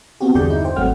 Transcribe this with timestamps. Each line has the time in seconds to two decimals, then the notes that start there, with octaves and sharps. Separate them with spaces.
0.20 B3 C4 F#4 G4
0.35 E2 G2 D3 G#4 D5 G6
0.50 D#4 E4
0.64 C5 G5
0.76 G#1 F#3 A3 C4 F#5 F6